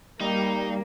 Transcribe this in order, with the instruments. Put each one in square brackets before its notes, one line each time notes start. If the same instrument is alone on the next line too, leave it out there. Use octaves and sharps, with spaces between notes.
[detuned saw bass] G3 [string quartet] A#3 [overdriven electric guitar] D#4